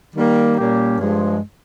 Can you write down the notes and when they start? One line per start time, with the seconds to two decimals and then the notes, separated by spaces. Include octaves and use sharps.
0.16 D#3 G3 A#3
0.56 A#2 G3 A#3 C#4 G4
0.99 G2 F3 G#3